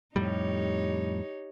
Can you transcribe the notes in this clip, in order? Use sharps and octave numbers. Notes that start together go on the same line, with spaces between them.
F2 A2 G3 D#4 G4 C#5